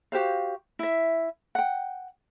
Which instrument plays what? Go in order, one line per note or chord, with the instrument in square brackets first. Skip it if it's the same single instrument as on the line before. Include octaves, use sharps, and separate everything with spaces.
[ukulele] F#4 G4 C5 F5
E4 E5
F#5 G5